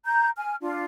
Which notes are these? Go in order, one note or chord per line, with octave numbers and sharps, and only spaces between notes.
A#5 G6
G#5 F6
D4 F4